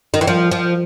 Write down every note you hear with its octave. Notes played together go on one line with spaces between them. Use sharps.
D#3
E3
F3
F3